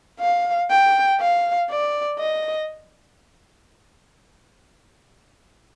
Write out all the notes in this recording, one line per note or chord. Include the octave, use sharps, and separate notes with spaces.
F5
G5
F5
D5
D#5